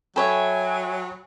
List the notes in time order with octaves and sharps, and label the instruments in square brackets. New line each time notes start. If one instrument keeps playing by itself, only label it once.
[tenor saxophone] F#3 [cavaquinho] A4 C#5 E5 [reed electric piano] G5 B5 [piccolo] G#5